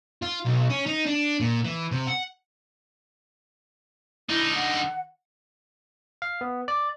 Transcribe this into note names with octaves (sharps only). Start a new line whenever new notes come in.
F4
B1
C#4
D#4
D4
A#2
E3
C3
F#5
D3 D#4 E4
F#5
F5
B3
D5